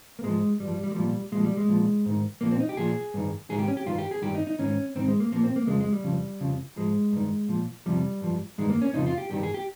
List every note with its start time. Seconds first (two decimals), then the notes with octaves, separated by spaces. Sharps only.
0.19 A#3
0.23 G#2 F3 G#3
0.60 G2 F3 G3
0.72 G3
0.84 G3
0.92 G#3
0.96 A#2 F3 G3
1.32 A#2 G#3
1.37 F3
1.44 G3
1.57 G#3
1.68 A#2 F3
2.06 G#2 D#3
2.41 A#2 F3 A#3
2.51 C4
2.60 D#4
2.69 G4
2.77 A#2 F3 G#4
3.14 G2 D#3
3.50 G#2 D#3 G#4
3.59 G4
3.68 C#4
3.77 G4
3.86 G2 D#3 F4
3.98 G4
4.11 G#4
4.22 G2 D#3 G4
4.35 D#4
4.47 D#4
4.59 G#2 D#3 C#4
4.95 G#2 D#3 C4
5.08 G#3
5.20 A#3
5.32 A#2 F3 A#3
5.44 C4
5.56 A#3
5.67 F2 C#3 F3 G#3
5.80 G#3
5.93 G3
6.03 F2 C#3 F3
6.41 F2 C#3 F3
6.76 G#2 F3 G#3
7.13 G2 D#3
7.49 A#2 F3
7.86 F2 C3 F3 G3
8.21 G2 F3
8.58 G2 D#3 G#3
8.69 A#3
8.82 C#4
8.94 F2 C#3 F3 D#4
9.06 F4
9.18 G4
9.31 G2 D#3 G4
9.43 G#4
9.54 G4